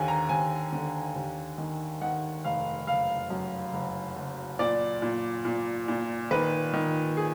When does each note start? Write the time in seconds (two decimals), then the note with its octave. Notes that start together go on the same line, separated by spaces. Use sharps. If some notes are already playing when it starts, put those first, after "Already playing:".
Already playing: D#2 D3 G#5
0.08 A#5
0.29 D#2 G#5
0.72 D3
1.16 D#2
1.58 D#3
2.01 D#3 F#5
2.45 F1 F5
2.87 F#1 F5
3.30 F#2
3.73 F#1
4.16 F#1
4.59 A#2 D5
5.02 A#2
5.45 A#2
5.88 A#2
6.31 D#3 B4
6.73 D#3
7.17 G#4